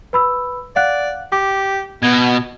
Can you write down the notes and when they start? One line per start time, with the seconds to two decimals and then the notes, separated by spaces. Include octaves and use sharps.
0.13 B4 B5 E6
0.76 D5 F5 F#5 F#6
1.32 G4 D6
2.03 B2 B3 G#6